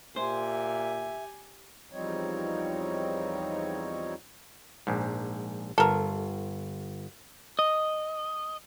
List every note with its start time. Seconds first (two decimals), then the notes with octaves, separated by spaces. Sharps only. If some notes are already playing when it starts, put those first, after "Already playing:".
0.16 A#2 G4 C5 E5 G#5
1.92 E2 F3 G3 C4 D#4 C#5
4.87 A#1 G#2
5.78 G1 A4 A#4
7.59 D#5